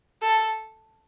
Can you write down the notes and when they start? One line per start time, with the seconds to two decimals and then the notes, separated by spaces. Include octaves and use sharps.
0.22 A4